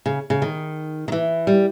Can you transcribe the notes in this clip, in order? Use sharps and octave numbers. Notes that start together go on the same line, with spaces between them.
C#3
C#3
D#3
D#3
E3
G3